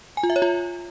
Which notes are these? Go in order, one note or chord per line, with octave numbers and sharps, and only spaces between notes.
G#5
F4
E5
C#5
F4